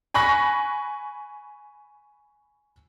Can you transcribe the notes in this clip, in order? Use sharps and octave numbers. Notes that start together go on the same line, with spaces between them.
G#5 B5 C#6 F#6 A#6